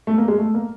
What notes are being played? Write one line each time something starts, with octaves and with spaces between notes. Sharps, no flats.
A3
A#3
G#3
A3
A#3